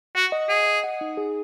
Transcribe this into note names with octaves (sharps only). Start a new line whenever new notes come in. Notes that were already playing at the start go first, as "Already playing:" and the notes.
F#4 F#5
D#5
G#4 F#5
D#5
F#5
D#4
G#4